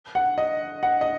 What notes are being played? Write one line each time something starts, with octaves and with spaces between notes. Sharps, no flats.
F#5
D#5
F#5
D#5